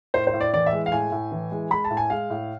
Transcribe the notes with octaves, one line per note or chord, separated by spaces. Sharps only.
A2 C5
C5
A2
D5
E3 D5
E5
G#3
F5
A2 G#5
A2
E3
G#3
G#3 B5
A5
A2
G#5
G#3 F5
A2